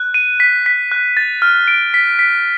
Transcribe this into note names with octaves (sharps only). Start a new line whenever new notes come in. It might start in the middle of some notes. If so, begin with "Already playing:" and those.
Already playing: F#6
D#7
B6
B6
F#6
A6
F6
D7
B6
B6